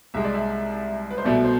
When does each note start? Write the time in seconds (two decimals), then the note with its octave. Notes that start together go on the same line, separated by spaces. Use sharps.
0.14 C2 C3 G#3 E5
0.25 D5
0.34 E5
1.11 B4
1.18 C5
1.24 C2 B2 A3 D5
1.44 C5